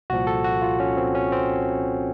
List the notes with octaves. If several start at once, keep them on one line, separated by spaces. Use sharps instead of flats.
C2 A#2 F3 F#4
A4
F#4
F4
C#4
C4
C#4
C4